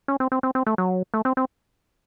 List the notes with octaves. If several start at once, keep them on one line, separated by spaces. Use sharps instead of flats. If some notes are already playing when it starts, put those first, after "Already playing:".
C#4
C4
C4
C4
C4
A3
F#3
A3
C4
C4